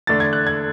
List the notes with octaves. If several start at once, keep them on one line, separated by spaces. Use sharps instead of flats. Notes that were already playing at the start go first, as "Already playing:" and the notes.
E2 D3 A3 D4 A6
G#6
F#6
G#6